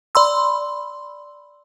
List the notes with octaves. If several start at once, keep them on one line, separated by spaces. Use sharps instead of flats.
D5 B5 C6 E6